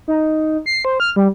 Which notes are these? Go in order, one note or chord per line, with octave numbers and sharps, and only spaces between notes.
D#4
C7
C5
F6
G3